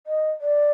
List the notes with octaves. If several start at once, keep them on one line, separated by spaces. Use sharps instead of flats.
D#5
D5